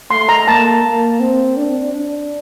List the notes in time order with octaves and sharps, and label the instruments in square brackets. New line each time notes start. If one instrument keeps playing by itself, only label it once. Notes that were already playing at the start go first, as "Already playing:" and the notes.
[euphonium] A3 [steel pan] C6
[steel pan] A#5
[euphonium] A#3 [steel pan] A5
[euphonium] A#3
C4
D4
D4